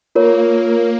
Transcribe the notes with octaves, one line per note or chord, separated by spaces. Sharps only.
A#3 F4 A#4 C#5